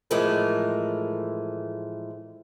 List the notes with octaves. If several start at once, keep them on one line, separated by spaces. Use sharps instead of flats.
A2 E3 F3 G#3 A3 A#4